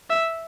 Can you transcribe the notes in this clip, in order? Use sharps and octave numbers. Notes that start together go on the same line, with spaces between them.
E5